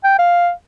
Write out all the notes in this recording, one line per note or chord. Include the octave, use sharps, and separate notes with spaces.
G5
F5